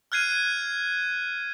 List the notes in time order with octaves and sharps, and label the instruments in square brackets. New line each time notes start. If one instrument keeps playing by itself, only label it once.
[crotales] F6 F#6 G#6 C7 D#7